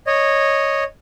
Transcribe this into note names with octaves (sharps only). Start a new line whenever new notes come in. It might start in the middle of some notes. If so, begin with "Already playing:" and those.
C#5 D#5